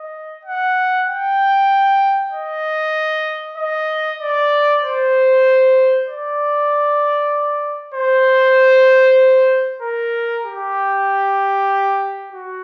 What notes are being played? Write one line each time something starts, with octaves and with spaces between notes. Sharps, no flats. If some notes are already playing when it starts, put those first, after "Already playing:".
Already playing: D#5
F#5
G5
D#5
D#5
D5
C5
D5
C5
A#4
G4
F#4